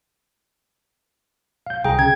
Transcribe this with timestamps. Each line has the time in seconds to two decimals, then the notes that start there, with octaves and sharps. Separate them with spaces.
1.66 F5 G6
1.85 C2 G#4 G5 A#5
1.99 C#3 G#6